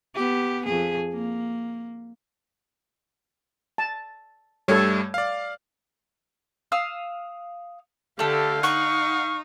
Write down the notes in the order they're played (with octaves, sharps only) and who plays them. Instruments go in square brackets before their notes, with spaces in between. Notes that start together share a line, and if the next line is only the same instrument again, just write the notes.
[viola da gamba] B3 G4
F2 G#4
A#3
[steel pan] A5
[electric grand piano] G2 G3 A3 [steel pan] A4 C#5
[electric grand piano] D5 F5
[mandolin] F5 D#6 E6
[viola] D3 G4 [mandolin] A3 A4 [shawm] F5
[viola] D#4 [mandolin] F#5 [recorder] C#6